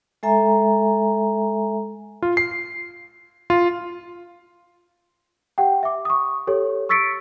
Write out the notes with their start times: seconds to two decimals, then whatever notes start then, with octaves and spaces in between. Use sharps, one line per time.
0.23 G#3 A4 E5 G#5 A#5
2.22 F4
2.37 C7
3.50 F4
5.58 G4 F#5 G5
5.83 E5 D6
6.05 C#6 D#6
6.47 G4 A4 C#5
6.89 C#6 E6 A6 B6 C#7 D7